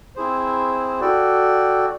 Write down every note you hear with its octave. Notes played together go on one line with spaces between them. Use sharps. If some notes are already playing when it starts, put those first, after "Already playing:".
C4 E4 G#4 C5
F#4 A4 D5 G5